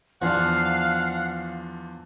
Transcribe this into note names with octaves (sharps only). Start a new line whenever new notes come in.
E2 F3 D4 F5 F#5